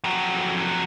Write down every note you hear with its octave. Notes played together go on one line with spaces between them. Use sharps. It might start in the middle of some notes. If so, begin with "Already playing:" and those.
F2 F#3